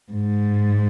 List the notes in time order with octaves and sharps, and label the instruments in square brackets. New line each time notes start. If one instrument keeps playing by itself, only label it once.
[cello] G#2